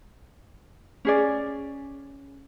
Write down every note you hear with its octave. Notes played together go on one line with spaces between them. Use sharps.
C#4 G#4 D5